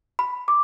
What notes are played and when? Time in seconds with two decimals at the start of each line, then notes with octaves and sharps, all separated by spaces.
0.19 B5
0.48 D6